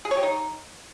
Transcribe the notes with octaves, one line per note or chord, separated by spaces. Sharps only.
G#4
C#5
G4
D#4